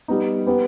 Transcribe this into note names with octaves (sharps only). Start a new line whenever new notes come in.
G3 B3 D#4
B3 G4 B4